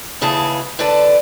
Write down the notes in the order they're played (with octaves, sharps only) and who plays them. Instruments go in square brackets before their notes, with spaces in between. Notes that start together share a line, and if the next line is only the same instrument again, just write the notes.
[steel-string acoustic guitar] D#2 C#3 E3 G#4 A5
D3 B4 D5 A5